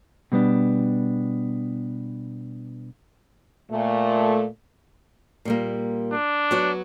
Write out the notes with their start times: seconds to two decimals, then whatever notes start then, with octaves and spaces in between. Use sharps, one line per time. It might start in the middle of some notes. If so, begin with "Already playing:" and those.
0.32 B2 G3 B3 D4
3.72 A#2 A3
5.45 A#2 G3 A#3
6.12 D4
6.51 F#3 B3 F#4